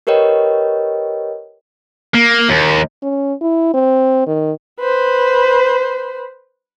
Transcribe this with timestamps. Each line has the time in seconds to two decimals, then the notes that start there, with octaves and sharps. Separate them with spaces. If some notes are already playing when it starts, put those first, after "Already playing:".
0.07 G4 A#4 B4 C#5 D#5 G5
2.15 A#3
2.50 D#2
3.02 C#4
3.41 E4
3.74 C4
4.27 D#3
4.81 B4 C5